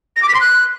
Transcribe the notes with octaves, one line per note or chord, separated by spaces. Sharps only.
A#6
D6
B6
C6
F#6